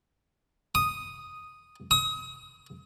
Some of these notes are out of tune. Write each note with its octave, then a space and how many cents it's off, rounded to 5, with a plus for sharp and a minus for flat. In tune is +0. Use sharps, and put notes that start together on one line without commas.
D#6 +0
D#6 +35